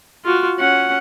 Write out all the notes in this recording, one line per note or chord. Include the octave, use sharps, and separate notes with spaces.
F4 F#4
C#4 F#5